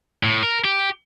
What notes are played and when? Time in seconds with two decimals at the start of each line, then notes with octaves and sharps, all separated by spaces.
0.23 A2
0.43 A#4
0.64 G4